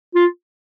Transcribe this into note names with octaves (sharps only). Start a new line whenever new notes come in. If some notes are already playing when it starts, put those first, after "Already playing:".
F4